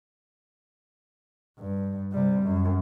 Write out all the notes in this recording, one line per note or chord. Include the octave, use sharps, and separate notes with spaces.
G2
C3 G3
F#2